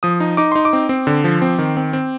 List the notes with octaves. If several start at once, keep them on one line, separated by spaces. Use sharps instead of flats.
F3 D#6
D#4
D#4 D6
D#4 C6
D6
C4
C4
D3
F3
C4
D#3
C4
C4